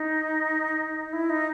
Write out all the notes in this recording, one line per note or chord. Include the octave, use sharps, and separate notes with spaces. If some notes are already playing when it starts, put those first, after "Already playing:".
Already playing: D#4
E4
D#4